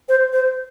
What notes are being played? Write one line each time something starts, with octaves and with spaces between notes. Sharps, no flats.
C5
C5